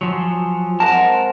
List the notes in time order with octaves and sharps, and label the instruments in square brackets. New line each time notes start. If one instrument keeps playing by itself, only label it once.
[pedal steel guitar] F3 F#3 [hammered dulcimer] G#5 C6
[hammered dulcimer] G#3 C4 F#5 [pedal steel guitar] A#4 [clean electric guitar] A5